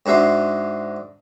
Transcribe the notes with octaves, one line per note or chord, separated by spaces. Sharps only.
G#2 D4 F#4 E5 C6